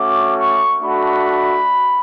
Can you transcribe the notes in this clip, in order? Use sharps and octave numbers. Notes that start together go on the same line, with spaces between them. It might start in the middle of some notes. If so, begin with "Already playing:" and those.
Already playing: A3 C#4 F#4 D6
C#6
A3 D4 F#4 B5